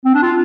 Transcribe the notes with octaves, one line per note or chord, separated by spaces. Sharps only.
C4
D4
F4